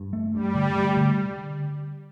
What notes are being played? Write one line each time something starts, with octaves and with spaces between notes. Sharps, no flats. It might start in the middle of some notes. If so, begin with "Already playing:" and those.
Already playing: G2
A3
G2 G3
D3
A3
D3